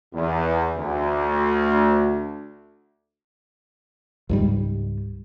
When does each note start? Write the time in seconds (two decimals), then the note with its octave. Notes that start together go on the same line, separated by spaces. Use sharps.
0.14 E2
0.76 D2
4.29 C#2 G#2 G3